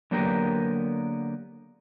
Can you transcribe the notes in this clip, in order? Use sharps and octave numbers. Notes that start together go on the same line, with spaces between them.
D3 F#3 A#3 B3 G4 A#4